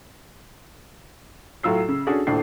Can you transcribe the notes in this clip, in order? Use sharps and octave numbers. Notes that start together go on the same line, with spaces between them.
A2 F#3 F4 E6 C7
C#3
C#4 D4 F#4 G#4 A4
D#1 A2 D4 C7